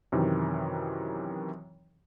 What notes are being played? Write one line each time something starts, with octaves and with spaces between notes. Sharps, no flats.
F#2 C3 D#3 E3